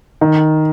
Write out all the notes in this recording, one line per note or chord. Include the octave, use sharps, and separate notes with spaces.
D#3